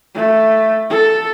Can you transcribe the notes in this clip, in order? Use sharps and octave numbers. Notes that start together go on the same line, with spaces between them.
A3
A4